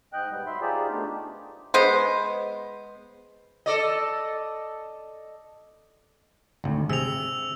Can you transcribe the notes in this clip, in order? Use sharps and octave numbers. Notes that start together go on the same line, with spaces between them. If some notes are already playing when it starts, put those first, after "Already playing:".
G#2 D#5 G5 F#6
B2 G3 B3
F#3 E5 B5 C6
D#4 F4 G4 G#4 C5 D5
A3 B3 D4 D#4 G4
G#3 B3 C5
A4 D5 D#5
G#1 D2
C3 G#4 E6 F7